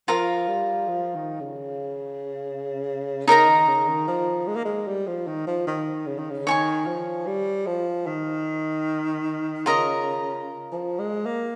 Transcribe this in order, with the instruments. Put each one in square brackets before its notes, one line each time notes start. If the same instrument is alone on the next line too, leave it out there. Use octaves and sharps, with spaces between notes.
[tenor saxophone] F3 [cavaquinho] F4 A#4 F5
[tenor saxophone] G3
F3
D#3
C#3
[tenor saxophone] C#3 [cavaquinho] D#4 A#4 D#5 A#5
[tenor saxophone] D#3
C#3
D#3
F3
G#3
A#3
G#3
G3
F3
D#3
F3
D#3
C#3
D#3
C#3
[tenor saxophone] D#3 [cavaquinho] C#5 G#5 C#6
[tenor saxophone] F3
G3
F3
D#3
[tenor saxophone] C#3 [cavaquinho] F4 A#4 D#5 A#5
[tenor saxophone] F3
G#3
A#3